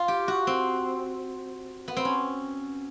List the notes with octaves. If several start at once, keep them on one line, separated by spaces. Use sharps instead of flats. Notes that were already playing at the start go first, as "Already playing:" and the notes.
Already playing: F4
G4
F#4
C4
B3
C4
C#4